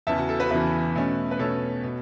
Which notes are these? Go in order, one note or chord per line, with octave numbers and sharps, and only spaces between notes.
E2 C#3 E3 E5 A5
F#4
A4
F#4 B4
E2 C#3 E3 B4 E5
B2 A3 C#4
B4
B2 A3 C#4 A4 C#5
B2